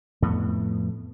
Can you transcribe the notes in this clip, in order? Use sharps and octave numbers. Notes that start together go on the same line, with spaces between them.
F2 A2 A3 B3